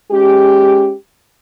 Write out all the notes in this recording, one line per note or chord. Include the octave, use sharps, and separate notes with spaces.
G#3 C#4 G4